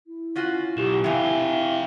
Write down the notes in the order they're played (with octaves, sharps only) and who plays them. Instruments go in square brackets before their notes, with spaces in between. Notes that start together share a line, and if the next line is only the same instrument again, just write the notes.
[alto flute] E4
[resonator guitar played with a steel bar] C#4 F4 F#4
[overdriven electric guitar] B1 [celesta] G4 E7
[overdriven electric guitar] C3 F4 [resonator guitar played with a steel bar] E3 C4 [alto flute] E4 [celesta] E5 F5 G#5